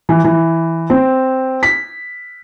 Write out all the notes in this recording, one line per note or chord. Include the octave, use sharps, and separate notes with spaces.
E3
E3
C4
B6